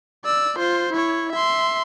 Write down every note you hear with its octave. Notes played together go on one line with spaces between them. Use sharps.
D5 E6
F4 C5
E4 C#5
E5 C6